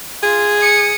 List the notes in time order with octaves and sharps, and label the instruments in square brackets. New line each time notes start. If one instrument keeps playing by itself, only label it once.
[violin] F4 [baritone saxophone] G#4
[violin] D#6 C#7